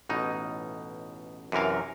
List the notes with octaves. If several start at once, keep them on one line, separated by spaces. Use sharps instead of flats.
A1 B2 D#4
F#2 C3 E3 A#4 F5